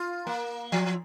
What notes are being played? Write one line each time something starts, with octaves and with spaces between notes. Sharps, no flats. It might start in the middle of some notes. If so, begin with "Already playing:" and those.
Already playing: F4
A#3
F3